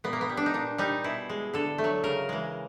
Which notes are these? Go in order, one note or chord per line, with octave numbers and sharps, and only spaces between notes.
A#2 B3
A#3
B3
G3
D4
D#4
A#2 D4
G3 D#4
B2 E4
G#3
D3 A4
A3
F#3
C#3 A#4
E3 G#3